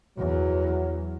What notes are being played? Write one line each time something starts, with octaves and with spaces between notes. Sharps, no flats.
E2 F#3